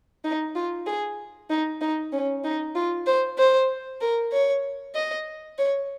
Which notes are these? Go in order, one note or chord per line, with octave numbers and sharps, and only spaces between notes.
D#4
F4
G#4
D#4
D#4
C#4
D#4
F4
C5
C5
A#4
C#5
D#5
C#5